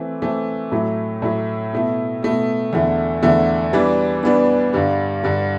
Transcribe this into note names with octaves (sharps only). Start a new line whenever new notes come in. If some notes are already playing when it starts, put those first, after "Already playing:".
Already playing: E3 A3 C4
E3 A3 C4
A2 F#3 A3 E4
A2 F#3 A3 E4
B2 A3 E4
B2 A3 E4
E2 D3 A3 E4
E2 D3 A3 E4
E3 G3 B3 D4
E3 G3 B3 D4
G2 D3 G3
G2 D3 G3